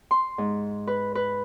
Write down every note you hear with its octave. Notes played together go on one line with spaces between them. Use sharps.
C6
G#2
B4
B4